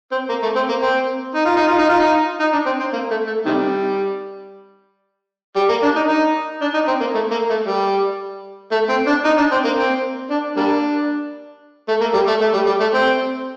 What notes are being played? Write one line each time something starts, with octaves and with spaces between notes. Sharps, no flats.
C4
A#3
A3
C4
A#3
C4
D#4
F4
D#4
F4
D#4
F4
D#4
D#4
D4
C4
C4
A#3
A3
A3
C3 D#3 G3
G3
A#3
D4
D#4
D#4
D4
D#4
C4
A#3
A3
A#3
A3
G3
A3
C4
D4
D#4
D4
C4
A#3
C4
D4
G3 A#3 D4
A3
A#3
G3
A3
A3
G3
G3
A3
C4